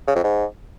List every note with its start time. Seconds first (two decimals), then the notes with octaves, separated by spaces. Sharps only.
0.07 C#3
0.16 F2
0.24 G#2